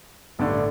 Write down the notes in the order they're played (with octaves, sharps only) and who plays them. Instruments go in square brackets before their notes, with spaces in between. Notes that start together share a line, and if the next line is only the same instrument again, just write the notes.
[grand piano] A1 G2 D3 A3 D4